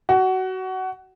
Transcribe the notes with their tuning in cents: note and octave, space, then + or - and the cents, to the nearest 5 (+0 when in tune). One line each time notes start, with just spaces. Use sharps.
F#4 +20